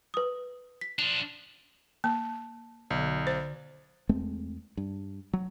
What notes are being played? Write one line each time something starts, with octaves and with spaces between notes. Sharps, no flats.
B4 D#6
B6
F3 D4 F7
A#3 A5
B1 D3
C5
E2 G#3 A3 C4
G2
F#3